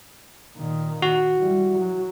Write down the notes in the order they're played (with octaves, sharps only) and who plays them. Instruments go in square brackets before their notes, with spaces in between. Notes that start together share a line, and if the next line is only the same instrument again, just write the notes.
[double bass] A#2 D#3
[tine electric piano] F#4
[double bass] E3 G3
F#3